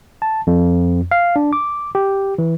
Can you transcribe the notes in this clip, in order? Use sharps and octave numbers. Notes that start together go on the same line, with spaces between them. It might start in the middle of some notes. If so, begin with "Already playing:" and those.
A5
F2
F5
D4
D6
G4
E3